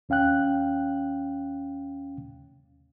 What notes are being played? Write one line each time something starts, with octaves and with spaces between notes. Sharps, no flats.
D#2 C#4 F5 G5 F#6